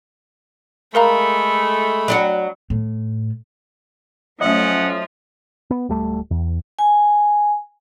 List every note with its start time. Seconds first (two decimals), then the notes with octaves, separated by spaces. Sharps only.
0.95 G#3 A3 A#4 F5 A#5 B5
2.08 F#3 D4 F#4
2.70 A2
4.41 F3 F#3 A3 C#4 D#5 E5 F#5
5.71 B3
5.89 D1 G3 A3
6.31 E2
6.79 G#5